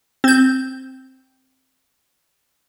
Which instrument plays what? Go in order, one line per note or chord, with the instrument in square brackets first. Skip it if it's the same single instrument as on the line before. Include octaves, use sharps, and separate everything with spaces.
[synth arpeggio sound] C4 G6